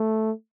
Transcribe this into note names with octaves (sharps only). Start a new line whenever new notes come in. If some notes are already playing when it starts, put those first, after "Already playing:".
Already playing: A3